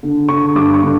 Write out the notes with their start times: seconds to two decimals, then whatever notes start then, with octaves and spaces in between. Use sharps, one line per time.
0.03 D3
0.29 D3 C#6
0.55 G2 D6
0.74 C#6
0.83 D3